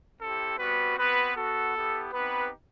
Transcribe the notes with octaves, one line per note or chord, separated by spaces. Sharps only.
C4 E4 G4 A4
G3 B3 C4 F#4 B4
B3 C4 F#4 B4
B3 F#4 A4
B3 E4 G4
B3 C4 D#4 G4 B4